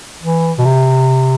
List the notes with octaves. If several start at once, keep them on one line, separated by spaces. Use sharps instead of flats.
E3
B2
C3